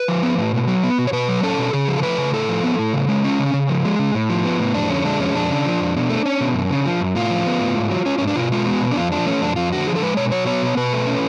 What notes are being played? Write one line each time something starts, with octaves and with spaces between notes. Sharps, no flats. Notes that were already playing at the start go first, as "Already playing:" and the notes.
Already playing: B4
F3
B3
A2
B2
F#3
B3
B2
C#5
B2 B4
F#3
C#4 A4
B2
C#3 G#4
F3
A4
A3 B4
C#3
A2 A4
F3
B3
A2
C#3
G#3
C#4
C#3
C#3
F3
G#3
C#3
A2
F3
B3
A2
F2 D4
D3 C#4
G#3 D4
F2 C#4
F2 D4
C#3
F3
F2
B2
A3
C#4
B2
F#2
C#3
F3
F#2
A2 F4
F3
B3
A2
G#2
F#3
C#4
G#2 C#4
D4
B2 F4
G#3 F4
B3 F#4
B2
D4
F2 F4
F3 D4
A3 C#4
F2 D4
F2 F4
D3 F#4
F3 G#4
A4
G#3 B4
B2 C#5
F#3 C#5
B3 C#5
B2
B2 B4
A3
C#4